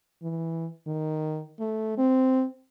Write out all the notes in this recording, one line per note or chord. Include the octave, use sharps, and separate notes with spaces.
E3
D#3
A3
C4